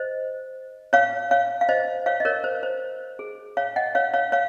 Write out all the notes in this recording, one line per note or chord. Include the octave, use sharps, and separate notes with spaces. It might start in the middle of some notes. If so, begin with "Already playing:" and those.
Already playing: C5 D#5
C#5 F5
C#5 F5
F5
C5 D#5
C#5 F5
D#5
A#4 C#5
C5
C5
G#4
C#5 F5
D#5 F#5
C#5 F5
C#5 F5
C#5 F5